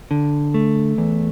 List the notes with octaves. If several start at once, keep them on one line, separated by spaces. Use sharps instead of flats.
D3
A3
E2